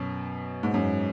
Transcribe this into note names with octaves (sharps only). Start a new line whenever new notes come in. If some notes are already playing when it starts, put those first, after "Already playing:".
Already playing: F#2 B2
G#2
F#2